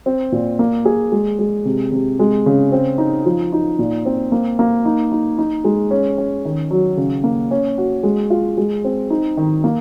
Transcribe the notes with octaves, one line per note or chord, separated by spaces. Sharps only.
C4
A#2
A#3
G#4
G#3
G#3
C3
C3
G#3
C#3
C4
D#4
F3
D#4
A#2
C4
A#3
A#3
D#4
D#4
D#4
G#3
C#4
C#4
D#3
F#3
C#3
A#3
C#4
F#4
G#3
F4
G#3
C4
D#4
D#3
A#3